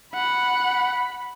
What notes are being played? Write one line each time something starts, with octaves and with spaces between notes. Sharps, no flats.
F#5 B5